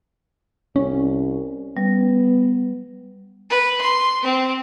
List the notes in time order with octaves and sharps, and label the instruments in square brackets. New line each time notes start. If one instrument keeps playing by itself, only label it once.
[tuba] C2 [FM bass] C#4
[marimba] G3 [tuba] B3
[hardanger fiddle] B4
C6
C4